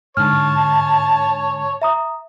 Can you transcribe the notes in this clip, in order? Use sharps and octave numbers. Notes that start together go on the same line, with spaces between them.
G#2 D3 C#5 A5 F6
E5 A#5 D#6